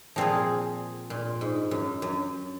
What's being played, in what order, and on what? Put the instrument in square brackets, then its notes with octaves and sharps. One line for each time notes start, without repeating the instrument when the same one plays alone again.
[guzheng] A#2 [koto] F3 C4 F4 G#4
[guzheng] A#2
G#2
F#2
F#2